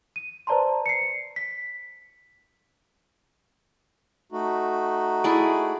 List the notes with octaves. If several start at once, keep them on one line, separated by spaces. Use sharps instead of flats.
D#7
B4 C5 D5 A5 A#5 C6
C7 C#7
B6
A3 D#4 F#4
E4 G#4 D5